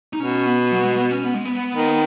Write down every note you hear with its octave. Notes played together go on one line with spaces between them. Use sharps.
D#4
B2 C#4
B3
F#3
B3
G#3
B3
C#4
B3
G#3
B3
D#3